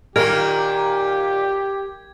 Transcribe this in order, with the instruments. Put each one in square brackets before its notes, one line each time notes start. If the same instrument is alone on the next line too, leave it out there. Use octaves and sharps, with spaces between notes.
[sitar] A#2 D#3 A#3 [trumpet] G4 [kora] A#4 [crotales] G#6